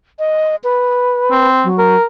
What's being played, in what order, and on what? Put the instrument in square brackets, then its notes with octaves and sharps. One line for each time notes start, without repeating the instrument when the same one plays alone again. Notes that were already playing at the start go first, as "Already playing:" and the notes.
[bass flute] D#5
B4
[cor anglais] C4
[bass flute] F#3
[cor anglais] A#4